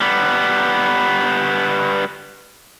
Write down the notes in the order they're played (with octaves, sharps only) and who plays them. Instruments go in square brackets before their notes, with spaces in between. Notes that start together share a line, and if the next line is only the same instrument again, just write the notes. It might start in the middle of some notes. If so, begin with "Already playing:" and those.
[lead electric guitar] G3 B3